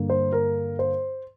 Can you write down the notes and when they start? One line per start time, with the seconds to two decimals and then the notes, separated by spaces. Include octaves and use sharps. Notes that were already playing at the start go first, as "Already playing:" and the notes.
Already playing: G2 D3 A#3
0.10 C5
0.32 A#4
0.79 C5